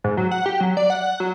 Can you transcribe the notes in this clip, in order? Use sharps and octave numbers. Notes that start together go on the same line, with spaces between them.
G#2
F#3
F#5
G4
F#3
D5
F#5
F#5
F#3